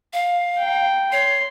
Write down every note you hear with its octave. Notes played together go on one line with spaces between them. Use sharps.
F5
G5 A#5
C#5 C6 C7